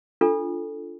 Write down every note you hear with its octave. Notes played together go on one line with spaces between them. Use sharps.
D4 F4 A4